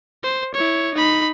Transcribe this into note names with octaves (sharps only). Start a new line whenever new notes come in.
C5
E4 C#5
D#4 B5